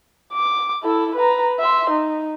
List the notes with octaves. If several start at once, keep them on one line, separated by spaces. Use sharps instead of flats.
D6
E4 A4
B4 A#5
E5 C6
D#4